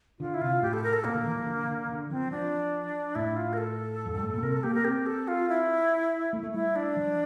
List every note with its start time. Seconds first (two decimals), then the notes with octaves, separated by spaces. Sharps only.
0.19 D3 F4
0.34 E4
0.41 C3 F4
0.62 A2 G4
0.73 A4
0.83 A#4
0.93 A4
1.04 A#2 A#3
1.15 D3
1.25 E3
1.37 F3
1.46 D3
1.68 D3
1.89 D3
2.10 F3 C4
2.31 F3 D4
3.15 A2 E4
3.36 F4
3.53 A#4
3.58 A4
4.06 F2
4.15 G2
4.23 A2
4.34 A#2
4.43 C3 A#4
4.52 A4
4.63 A#3 G4
4.74 A#4
4.85 C4 G4
5.06 A4
5.28 F4
5.49 E4
6.33 A3
6.43 A3
6.54 G3 E4
6.76 D4
6.96 F3